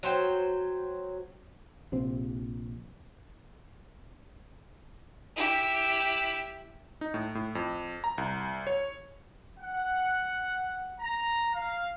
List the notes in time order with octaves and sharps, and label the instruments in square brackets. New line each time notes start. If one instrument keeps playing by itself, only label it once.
[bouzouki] F#3 C5 G5
[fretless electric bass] A#1 C3 C4
[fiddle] E4 G4
[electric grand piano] D#4
A2
A2
F2
A#5
C2
C#5
[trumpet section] F#5
A#5
F5